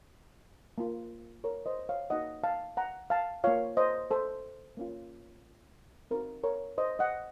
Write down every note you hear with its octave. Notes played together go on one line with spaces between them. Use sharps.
A#3 F4
A#4 C#5
C5 D#5
C#5 F5
A#3 D#4 F#4 D#5 F#5
F5 A5
F#5 A#5
F5 A5
A#3 F4 C#5 F5
C5 D#5
A4 C5
A#3 C#4 F4
C4 D#4 F#4 A#4
A#4 C#5
C5 D#5
D#5 F#5